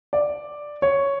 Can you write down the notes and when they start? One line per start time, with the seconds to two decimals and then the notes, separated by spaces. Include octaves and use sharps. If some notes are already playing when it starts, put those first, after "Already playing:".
0.13 D5
0.82 C#5